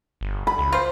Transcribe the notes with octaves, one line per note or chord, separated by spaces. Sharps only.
G1
B5
C#2
F4 C5